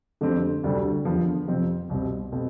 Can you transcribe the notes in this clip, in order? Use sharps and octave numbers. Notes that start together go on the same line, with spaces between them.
F2 D3 A3 C4 G4
D2 C3 G3 D4 A4
E2 D3 F3 B3
F2 C3 F3 C4
C2 B2 G3 C4
B2 A3 C4